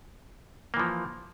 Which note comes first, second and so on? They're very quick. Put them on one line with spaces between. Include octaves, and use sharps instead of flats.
A#3 E3 F3